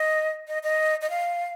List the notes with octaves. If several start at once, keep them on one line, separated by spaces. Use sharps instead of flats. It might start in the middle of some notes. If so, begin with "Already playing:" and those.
Already playing: D#5
D#5
D#5
D#5
F5